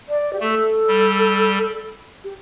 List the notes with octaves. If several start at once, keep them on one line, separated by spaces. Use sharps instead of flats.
D5
G4
A3 A4
G3
G4